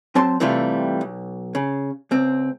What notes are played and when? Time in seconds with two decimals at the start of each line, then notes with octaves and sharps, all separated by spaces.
0.15 F#3 C4 A5 C6
0.40 C3 E3 G3 A3 F4
1.01 B1
1.55 C#3
2.11 C#2 C4